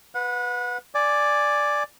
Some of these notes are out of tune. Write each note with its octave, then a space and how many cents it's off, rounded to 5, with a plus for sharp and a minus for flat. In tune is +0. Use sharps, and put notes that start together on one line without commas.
B4 +0 F#5 -30
D5 +0 G#5 +0